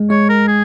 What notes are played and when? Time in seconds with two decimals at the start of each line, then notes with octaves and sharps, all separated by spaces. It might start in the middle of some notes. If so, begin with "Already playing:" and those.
Already playing: G#3
0.10 G#3 C#5
0.29 A#4
0.48 G#4